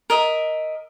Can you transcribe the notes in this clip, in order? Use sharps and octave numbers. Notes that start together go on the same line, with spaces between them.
A#4 D#5 E5